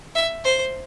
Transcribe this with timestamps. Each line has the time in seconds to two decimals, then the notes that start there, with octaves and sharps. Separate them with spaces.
0.15 E5
0.44 C5